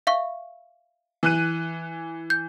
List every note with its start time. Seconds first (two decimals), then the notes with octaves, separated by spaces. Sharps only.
0.07 E5 F5 C#6
1.23 E3 F#6 D#7
2.30 G6